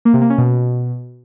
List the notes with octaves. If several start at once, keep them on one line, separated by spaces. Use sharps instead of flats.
A#3
C3
A#3
C#4
B2